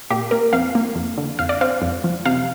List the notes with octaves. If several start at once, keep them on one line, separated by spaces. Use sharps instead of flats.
A#2 G4
A#3 A#4
F2 F5
A#3
F2
D3
F2 F5
D5
C4 F5
F2
F3
C3 F5